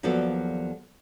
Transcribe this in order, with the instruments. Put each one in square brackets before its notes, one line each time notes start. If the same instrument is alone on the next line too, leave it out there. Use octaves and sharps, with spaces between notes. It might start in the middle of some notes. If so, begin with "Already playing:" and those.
[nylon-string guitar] D#2 F3 F#3 B3 A4 D5